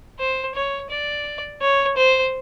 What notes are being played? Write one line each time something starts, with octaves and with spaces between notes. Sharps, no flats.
C5
C#5
D5
C#5
C5